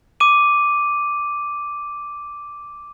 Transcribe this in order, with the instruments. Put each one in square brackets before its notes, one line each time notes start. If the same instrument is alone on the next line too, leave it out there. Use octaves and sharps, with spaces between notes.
[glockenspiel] D6 D#7